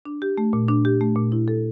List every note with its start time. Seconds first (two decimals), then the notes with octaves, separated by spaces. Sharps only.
0.05 D4
0.22 G4
0.38 A3
0.53 A#2
0.69 D4
0.85 G4
1.01 A3
1.16 A#2
1.32 E4
1.48 A4